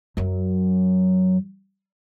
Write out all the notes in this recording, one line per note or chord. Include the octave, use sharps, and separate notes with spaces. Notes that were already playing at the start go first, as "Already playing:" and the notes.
F#2 F#3